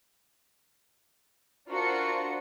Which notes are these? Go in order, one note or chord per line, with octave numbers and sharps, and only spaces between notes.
D4 F4 F#4 A#4 C5 C#7